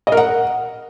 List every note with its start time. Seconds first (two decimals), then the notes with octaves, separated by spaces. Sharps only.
0.07 D#5
0.12 A#4
0.17 F#5